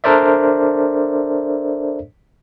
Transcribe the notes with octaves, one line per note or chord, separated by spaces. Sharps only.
D4 A4 A#4 C5 D5 E5